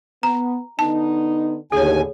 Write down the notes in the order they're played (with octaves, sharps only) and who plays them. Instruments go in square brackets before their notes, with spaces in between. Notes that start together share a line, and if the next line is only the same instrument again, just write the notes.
[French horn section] B3 [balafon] A#5
[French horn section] D3 B3 D#4 [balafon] A5
[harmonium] D#2 G#5 [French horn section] A2 D3 [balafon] G#4 C#5